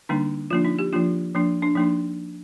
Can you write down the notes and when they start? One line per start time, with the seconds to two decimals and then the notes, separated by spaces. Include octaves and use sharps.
0.09 D3 G3 A#3 D4 D#4
0.50 F3 A#3 D4 F4
0.65 D#4
0.79 G4
0.93 F3 A#3 D4 F4
1.35 F3 A#3 D4
1.62 D4
1.75 F3 A#3 D4 D#4